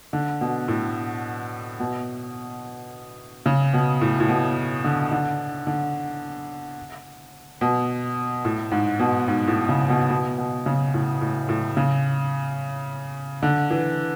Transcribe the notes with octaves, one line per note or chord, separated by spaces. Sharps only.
D3
B2
A2
B2
C#3
B2
A2
A2
B2
D3
D3
D3
B2
A2
G#2
B2
G#2
A2
C#3
B2
B2
B2
C#3
A2
A2
A2
C#3
D3
E3